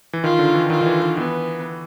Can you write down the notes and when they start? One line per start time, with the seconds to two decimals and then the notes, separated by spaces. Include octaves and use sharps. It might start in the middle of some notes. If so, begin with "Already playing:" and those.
0.13 E3
0.24 D#3 F4
0.39 D3
0.54 E3
0.70 D#3 F4
0.81 D#3
0.86 E3
1.02 E3
1.17 E3 B3